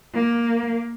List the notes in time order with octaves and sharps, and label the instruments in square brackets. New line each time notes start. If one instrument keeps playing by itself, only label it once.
[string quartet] A#3